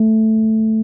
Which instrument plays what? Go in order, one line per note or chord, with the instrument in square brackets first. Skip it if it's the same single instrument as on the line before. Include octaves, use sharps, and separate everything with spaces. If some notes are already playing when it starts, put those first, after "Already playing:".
Already playing: [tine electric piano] A3